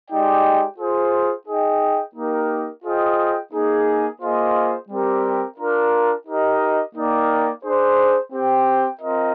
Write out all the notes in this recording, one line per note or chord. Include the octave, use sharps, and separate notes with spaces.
G#3 D#4 G4 D5 G5
F4 G#4 C5
D#4 G#4 D#5 G5
A#3 D#4 G4 A#4
F4 G#4 C5 D#5 G5
A#3 D#4 G#4
A#3 F4 G#4 C5 D#5
G3 C4 G4 A#4
D4 F4 A#4
D#4 G4 A#4 D#5
A#3 D#4 A#4 D5 G5
D4 G#4 C5
C4 G4 C5 G5
C4 F4 A#4 D#5